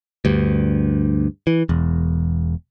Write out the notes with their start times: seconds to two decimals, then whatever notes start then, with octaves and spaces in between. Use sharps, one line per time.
0.25 D2 G2
1.47 E3
1.69 E1 E2